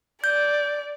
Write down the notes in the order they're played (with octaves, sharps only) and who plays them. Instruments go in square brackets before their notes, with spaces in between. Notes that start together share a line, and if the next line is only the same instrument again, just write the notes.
[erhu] D5 [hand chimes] G6